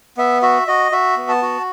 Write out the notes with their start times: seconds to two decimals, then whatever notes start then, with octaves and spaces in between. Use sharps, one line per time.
0.17 B3 E5
0.42 F#4 E5
0.67 F#4 D#5
0.92 F#4 E5
1.17 B3
1.29 A5
1.42 F#4